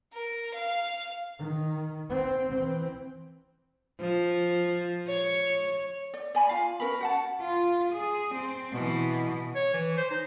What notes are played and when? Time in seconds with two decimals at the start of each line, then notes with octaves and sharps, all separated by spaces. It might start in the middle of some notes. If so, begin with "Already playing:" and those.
0.14 A#4
0.55 F5
1.39 D#3
2.09 C4
2.52 E3 C4
4.00 F3
5.07 C#5
6.14 D5
6.35 D5 G#5 B5
6.49 F4 F5
6.80 C#4 A#4 B4 B5
7.00 F#4 F#5 A5
7.41 F4
7.93 G#4
8.35 C4
8.72 B2 E3
9.55 C#5
9.73 E3
9.97 C5
10.11 D#4